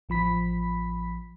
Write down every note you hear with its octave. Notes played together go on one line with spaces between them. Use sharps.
A1 F3 B5 B6